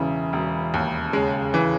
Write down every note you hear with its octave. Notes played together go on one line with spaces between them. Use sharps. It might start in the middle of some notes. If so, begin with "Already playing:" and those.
Already playing: E1 C#3 E3
E1
D#2
C#3 G#3
E3